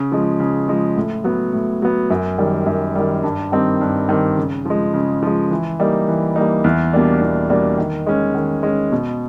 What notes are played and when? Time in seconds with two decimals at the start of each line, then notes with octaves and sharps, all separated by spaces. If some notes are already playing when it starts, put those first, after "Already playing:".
Already playing: C#3
0.12 F3 G#3
0.40 C#3
0.68 F3 G#3
0.96 A2
1.24 F#3 B3
1.53 A2
1.82 F#3 B3
2.10 F#2
2.38 D#3 G3
2.66 F#2
2.95 D#3 G3
3.24 G2
3.52 D#3 G3 C4 D#4
3.81 G2
4.09 D#3 G3 C4 D#4
4.37 C#3
4.66 F3 G#3
4.94 C#3
5.23 F3 G#3
5.51 E3
5.80 G3 A#3 D#4
6.08 E3
6.36 G3 A#3 D#4
6.64 E2
6.93 B2 G3 A#3 D4
7.21 E2
7.50 B2 G3 A#3 D4
7.78 D#3
8.07 G#3 C#4
8.35 D#3
8.63 G#3 C#4
8.92 B2